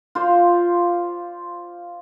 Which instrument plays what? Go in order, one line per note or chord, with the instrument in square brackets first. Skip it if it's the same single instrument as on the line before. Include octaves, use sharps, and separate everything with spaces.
[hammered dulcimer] F4 C5 D5 F5